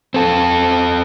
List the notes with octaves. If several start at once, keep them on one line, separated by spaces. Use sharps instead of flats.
C4 A4